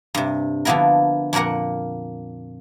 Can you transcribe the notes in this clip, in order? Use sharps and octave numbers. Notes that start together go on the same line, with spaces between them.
G2 C3
D3 F3 A#3 B3 E4 A#4
F2 A#2 A#3 A#4 F#5